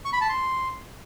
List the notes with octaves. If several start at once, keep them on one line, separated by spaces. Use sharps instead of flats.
C#6
B5
A5
C6